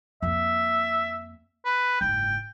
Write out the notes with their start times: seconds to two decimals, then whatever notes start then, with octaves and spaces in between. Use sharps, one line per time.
0.22 F2 A#3 E5
1.65 B4
2.01 F#1 G#2 G5